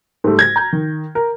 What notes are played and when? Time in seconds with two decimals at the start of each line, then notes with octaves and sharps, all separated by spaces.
0.24 G#2 G3 A3
0.39 G#6 A#6
0.56 A#5 G6
0.73 D#3
1.15 A#4